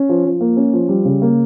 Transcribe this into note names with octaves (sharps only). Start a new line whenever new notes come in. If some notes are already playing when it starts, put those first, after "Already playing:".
Already playing: C#4
F3
F3
A#3
C#4
F3
G3
C#3
A#3